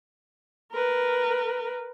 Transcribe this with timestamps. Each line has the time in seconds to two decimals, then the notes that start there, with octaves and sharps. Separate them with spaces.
0.72 A#4 B4